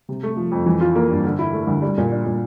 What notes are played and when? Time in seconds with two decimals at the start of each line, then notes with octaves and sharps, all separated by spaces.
0.09 C3
0.23 A3
0.37 F3
0.52 F2
0.66 E3
0.81 F4
0.95 A#3
1.10 G2
1.25 D3
1.39 E4
1.53 A3
1.67 D2
1.82 G3
1.97 A#2
2.12 D4
2.26 A#2